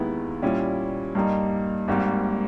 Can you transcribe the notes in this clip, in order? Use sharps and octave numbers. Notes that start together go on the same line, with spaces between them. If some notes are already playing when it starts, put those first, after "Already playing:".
Already playing: D#2 D#3 G#3 B3 E4
A#2 G3 C#4 E4
G2 G3 A#3 D#4
G#1 G#2 G3 A#3